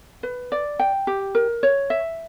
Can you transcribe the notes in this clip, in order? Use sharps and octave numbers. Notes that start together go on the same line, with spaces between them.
B4
D5
G5
G4
A#4
C#5
E5